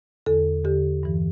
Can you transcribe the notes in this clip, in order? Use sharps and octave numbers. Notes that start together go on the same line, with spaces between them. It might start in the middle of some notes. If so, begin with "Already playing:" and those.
E2 D3 A4
E2 D3 G4
G2 E3